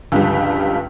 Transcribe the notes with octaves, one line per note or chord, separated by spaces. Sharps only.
C#2 G2 D3 F3 G3